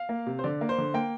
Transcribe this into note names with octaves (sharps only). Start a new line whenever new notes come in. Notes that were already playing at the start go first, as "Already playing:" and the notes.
Already playing: F5
A#3
C3
C5
D3 D5
A#3
C5
D3
A#3 G5